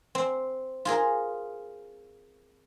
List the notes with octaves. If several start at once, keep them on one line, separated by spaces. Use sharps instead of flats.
C4
F4 G#4 A#4